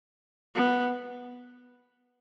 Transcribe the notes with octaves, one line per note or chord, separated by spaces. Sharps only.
B3